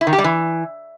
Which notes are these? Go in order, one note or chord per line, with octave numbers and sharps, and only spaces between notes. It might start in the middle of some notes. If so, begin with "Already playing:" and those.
E4
D#3
G4
G3
E3